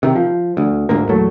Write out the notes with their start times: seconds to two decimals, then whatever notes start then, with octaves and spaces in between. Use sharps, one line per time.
0.03 C3 D#3
0.16 F3
0.57 D2
0.89 G1 D2 G#2 A#3
1.09 E2 A#2 F#3 A3